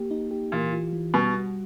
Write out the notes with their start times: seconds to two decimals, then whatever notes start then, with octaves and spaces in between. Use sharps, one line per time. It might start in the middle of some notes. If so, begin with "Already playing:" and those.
Already playing: A#3 G4
0.11 D#4
0.31 G4
0.52 A#2 E3
0.73 F4
0.93 E3
1.14 B2 G3
1.34 F#4